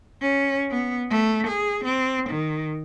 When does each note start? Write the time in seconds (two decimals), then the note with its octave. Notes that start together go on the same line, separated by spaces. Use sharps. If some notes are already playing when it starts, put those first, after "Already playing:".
0.22 C#4
0.71 B3
1.10 A3
1.47 G#4
1.85 C4
2.29 D#3